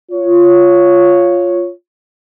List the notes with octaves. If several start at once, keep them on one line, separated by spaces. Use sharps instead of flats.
F4 C#5